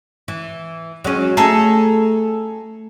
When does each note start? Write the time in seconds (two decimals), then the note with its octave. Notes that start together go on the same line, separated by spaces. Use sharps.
0.28 E3
1.04 F#3 G#3 C#4
1.37 A3 G#4 A4 A#5